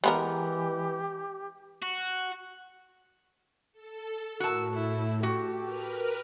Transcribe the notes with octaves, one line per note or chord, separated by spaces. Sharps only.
E3 G#3 B3 G4 A#4
F#4
A4
A2 F#4 A#4 A5 E6
A3 E4
F#4 G4 A4
A#4 B4 F6